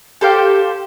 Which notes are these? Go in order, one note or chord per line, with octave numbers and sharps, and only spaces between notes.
G4 A4 C5 F5